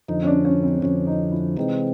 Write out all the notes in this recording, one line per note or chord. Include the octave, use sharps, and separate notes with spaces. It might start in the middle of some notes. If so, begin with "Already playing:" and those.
F2 D3 F3 D#4
C#4
D4
C#4
C4
F2 D3 F3 C#4
D#4
E4
C3 E3 G#3 C4 D#4